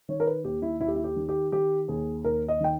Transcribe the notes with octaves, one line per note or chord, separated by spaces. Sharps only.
D#3 C#5
A#4
B4
D#2 G4
E4
D#2 E4
G4
E4
G4
D#3
G4
D#3 G4
D#2 G#4
D#2 A#4
D#5
D#3 G5